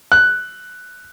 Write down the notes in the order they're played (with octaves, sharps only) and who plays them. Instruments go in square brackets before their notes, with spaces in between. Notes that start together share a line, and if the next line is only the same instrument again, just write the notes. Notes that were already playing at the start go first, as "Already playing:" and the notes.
[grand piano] F#6